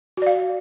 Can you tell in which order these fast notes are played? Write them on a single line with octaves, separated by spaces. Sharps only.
F#4 D5 F5